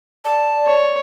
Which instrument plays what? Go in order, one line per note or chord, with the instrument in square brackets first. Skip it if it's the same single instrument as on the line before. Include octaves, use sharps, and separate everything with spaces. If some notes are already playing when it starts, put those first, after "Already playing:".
[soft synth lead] D5 [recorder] A5
[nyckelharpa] C#5